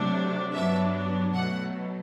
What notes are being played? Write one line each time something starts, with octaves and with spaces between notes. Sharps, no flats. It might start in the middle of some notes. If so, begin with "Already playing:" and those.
Already playing: C3 F#3 A3 D4
G2 F#3 B3 D4 E5
B2 F#3 A3 F#5